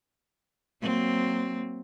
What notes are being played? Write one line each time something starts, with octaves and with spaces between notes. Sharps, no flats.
F#3 A#3 C4